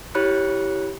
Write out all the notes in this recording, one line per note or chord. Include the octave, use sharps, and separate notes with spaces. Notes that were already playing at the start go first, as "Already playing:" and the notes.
E4 G4 C#5 B5 F#6 C#7